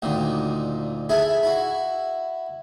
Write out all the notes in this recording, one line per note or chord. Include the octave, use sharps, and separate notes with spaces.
D2 A#2 D#3
E4 G#4 A4 E5
E4 F#4